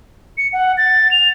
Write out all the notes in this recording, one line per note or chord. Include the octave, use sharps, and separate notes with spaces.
C#7
F#5
A6
F7